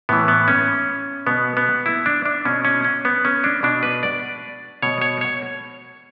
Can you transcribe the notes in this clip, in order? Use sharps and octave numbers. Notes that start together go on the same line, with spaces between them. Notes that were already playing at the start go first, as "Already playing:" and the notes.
A2 E3 B3
B3
C#4
B2 B3
B3
E4
D4
D4
B2 C#4
C#4
C#4
B3
C#4
D4
B2 D4
B4
D5
B2 C#5
C#5
C#5